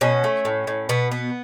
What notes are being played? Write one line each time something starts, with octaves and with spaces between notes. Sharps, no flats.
B2 C#4
A3
A2
A2
B2 B3
B3